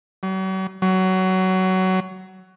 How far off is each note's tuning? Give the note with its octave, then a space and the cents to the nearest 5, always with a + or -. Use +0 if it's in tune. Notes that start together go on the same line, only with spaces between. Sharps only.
F#3 +45
F#3 +20